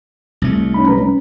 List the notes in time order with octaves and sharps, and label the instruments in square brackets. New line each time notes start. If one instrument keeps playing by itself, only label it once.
[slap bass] C2 A3
[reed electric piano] C#4 D#4 B5
G3 B4 A#5
C#4